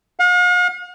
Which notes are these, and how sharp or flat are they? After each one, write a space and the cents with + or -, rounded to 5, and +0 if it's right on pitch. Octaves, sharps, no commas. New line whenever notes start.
F5 +45